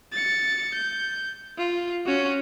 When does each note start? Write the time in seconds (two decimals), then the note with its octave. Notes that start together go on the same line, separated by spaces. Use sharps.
0.13 A6 C#7
0.74 G6
1.58 F4
2.06 C#4 F#4